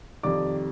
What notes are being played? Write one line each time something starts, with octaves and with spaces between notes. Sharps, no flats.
F2 C3 D#3 G3 D5 D6